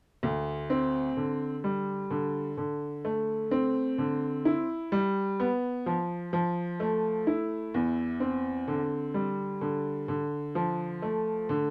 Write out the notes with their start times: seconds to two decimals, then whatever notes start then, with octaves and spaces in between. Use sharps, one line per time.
0.23 D2
0.70 C4
1.17 D3
1.64 G3
2.11 D3
2.57 D3
3.05 A3
3.51 C4
3.98 D3
4.45 E4
4.92 G3
5.40 B3
5.86 F3
6.33 F3
6.80 A3
7.27 E4
7.74 E2
8.20 C4
8.68 D3
9.14 G3
9.61 D3
10.08 D3
10.55 F3
11.02 A3
11.49 D3